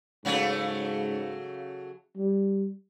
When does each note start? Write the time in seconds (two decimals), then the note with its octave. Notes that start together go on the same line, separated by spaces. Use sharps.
0.25 G#2 C#3 F#3 A3
2.17 G3